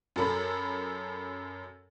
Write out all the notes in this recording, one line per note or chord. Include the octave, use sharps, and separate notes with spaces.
F#2 A4 B5